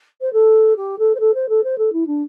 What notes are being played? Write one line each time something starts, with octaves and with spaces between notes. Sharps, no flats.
C5
A4
G4
A4
C5
A4
C5
A4
C5
A4
E4
D4